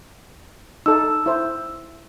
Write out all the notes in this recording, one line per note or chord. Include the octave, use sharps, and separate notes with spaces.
D#4 A4 E6
E4 C5